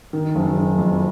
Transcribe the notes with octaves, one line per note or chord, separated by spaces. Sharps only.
D#3
F#1
F#1
F2